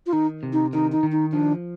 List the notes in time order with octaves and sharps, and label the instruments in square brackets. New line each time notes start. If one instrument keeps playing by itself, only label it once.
[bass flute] F4
[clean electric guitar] D#3 [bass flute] D#4
[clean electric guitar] C3
[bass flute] D#4
[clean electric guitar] D#3 [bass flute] D#4
[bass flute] D#4
[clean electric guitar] D#3
[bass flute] D#4
[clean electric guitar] F3 [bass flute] D4